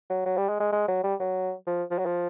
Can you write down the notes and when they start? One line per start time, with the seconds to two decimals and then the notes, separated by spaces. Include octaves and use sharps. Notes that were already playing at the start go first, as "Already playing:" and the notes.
0.10 F#3
0.26 F#3
0.37 G3
0.49 G#3
0.60 G#3
0.72 G#3
0.88 F#3
1.04 G3
1.20 F#3
1.67 F3
1.91 F3
1.99 F#3
2.06 F3